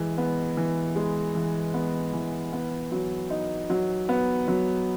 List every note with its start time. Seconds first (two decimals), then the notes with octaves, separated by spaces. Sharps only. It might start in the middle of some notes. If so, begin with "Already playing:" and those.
Already playing: E3 G#3
0.18 B3
0.57 E3
0.96 G#3
1.35 E3
1.74 B3
2.13 E3
2.53 B3
2.92 F#3
3.30 D#4
3.70 F#3
4.09 B3
4.48 F#3